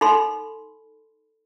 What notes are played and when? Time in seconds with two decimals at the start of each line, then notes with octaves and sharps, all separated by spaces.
0.01 D#4 A4 B5 C6